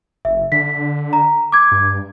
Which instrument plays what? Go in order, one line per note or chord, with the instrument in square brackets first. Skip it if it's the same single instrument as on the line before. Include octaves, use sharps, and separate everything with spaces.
[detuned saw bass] F#1 [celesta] E5
[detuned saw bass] D3 [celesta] B6
[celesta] A#5
D6 G#6
[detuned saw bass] G2